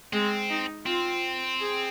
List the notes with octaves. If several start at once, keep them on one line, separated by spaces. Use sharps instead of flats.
G#3 C4
D#4
C4 F4
G#4